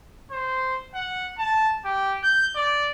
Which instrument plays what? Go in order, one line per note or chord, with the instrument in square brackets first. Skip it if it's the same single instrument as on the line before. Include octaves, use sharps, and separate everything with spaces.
[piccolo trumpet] C5
F#5
A5
G4
G6
D5